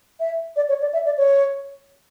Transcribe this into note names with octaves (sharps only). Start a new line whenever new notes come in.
E5
D5
C#5
D5
E5
D5
C#5